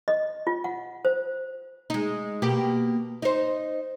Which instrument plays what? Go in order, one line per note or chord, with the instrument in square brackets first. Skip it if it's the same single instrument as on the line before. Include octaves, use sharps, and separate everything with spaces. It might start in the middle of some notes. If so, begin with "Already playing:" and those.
[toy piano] D#5
F4
F#5
C5
[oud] G#3 D#4
B2 A#3 G4
D#4 C5